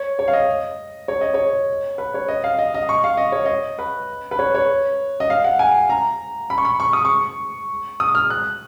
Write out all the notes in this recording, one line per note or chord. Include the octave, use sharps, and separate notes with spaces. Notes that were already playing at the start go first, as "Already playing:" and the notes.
Already playing: C#5
C#5
F5
D#5
C#5
D#5
C#5
B4
C#5
D#5
F5
D#5
D#5
C#6
F5
D#5
C#5
D#5
B4
B4
C#5
C#5
D#5
F5
F#5
G#5
A#5
B5
C#6
B5
C#6
D#6
C#6
D#6
F6
F#6